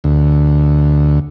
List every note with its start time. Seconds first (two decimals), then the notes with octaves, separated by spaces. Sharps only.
0.04 D2